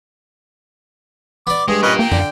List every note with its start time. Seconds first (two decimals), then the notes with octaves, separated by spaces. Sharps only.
1.47 B3 D5 D6
1.68 G2 G#3 G#4
1.83 C#4 F4 A#4 B4 D#5
1.99 A#3 G5
2.12 F#2 D3